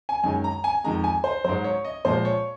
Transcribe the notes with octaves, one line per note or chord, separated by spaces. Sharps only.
G#5
F#2 D#3 G#3 G#5
A#5
G#5
F2 D#3 G#3 A#5
G#5
C5
G#2 F#3 C5
C#5
D#5
A#2 F3 G#3 C5
C#5